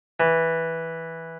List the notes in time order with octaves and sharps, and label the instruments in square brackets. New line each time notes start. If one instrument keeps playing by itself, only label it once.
[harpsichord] E3